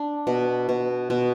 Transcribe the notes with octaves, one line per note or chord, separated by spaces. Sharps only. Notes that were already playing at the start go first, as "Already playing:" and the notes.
Already playing: D4
B2
B2
B2